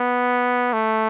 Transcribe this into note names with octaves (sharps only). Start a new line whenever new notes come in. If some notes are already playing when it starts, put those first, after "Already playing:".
Already playing: B3
A3